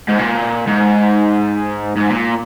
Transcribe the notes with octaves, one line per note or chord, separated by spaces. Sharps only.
G#2
A#2
G#2
G#2
A#2